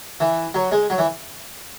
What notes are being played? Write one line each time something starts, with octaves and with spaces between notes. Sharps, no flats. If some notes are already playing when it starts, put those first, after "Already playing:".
E3
F#3
G#3
F#3
E3